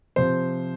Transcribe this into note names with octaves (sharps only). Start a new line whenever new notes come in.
C3 F3 C5